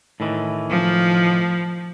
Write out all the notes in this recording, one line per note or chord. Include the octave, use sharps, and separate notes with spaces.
A2 D#3 E3
F3